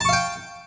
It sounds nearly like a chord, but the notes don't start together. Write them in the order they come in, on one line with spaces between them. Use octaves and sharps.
A5 C#6 F5 G5